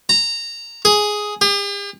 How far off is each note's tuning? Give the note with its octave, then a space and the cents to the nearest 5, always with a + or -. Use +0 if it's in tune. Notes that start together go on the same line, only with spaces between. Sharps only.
A#5 -15
G#4 +5
G4 +45